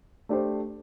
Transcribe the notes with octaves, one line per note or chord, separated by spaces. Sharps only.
A3 D4 G4 C5